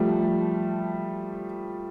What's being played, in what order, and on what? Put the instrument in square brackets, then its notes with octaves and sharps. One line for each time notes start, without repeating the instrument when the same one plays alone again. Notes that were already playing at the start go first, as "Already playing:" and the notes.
Already playing: [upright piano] F3 G3 A3